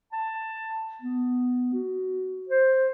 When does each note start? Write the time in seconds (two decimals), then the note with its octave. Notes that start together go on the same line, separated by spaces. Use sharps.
0.13 A5
1.02 B3
1.74 F#4
2.49 C5